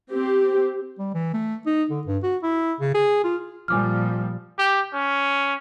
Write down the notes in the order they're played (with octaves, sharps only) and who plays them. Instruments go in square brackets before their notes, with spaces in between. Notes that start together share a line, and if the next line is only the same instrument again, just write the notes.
[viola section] C4 G4
[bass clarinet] G3
E3
A3
D#4
D3
G2
F#4
E4
C#3
G#4
F4
[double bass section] A#2 F3 G3 [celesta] G#5 D6 F6
[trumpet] G4
C#4